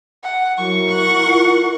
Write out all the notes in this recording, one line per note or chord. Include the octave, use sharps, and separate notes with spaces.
F#5
F#3 E4 A#4 C#6
F#5
F4